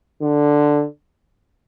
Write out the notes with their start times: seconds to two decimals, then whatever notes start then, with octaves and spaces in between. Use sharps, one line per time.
0.22 D3